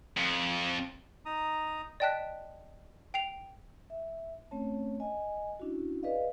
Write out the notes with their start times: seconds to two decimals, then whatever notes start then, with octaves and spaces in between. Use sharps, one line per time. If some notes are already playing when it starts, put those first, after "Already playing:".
0.17 F2
1.26 D#4 A#5 D#6
2.00 D5 D#5 G5 A5 F#6 B6
3.14 G5 C7 F7
3.90 E5
4.51 A3 C4 C#4 C#5 A5
5.00 D#5 G#5
5.60 C#4 D4 E4 F#4
6.03 G#4 B4 D5 D#5 F5